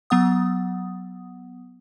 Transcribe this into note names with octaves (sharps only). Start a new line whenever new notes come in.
F#3 B3 F#5 D#6